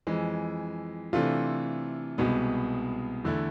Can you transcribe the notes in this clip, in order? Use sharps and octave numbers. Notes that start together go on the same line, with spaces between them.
F2 E3 G#3
C3 E3 A3 D4 F4
C2 B2 G#3 B3
E2 D3 A3 E4